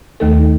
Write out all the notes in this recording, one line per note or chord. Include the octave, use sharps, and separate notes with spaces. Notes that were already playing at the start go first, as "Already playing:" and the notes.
D#2 D#3 A3 D#4 A4